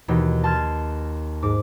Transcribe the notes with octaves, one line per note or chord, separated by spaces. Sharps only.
D#2 B2 E3
A5 C6 F6 G#6 A6
G#2 D6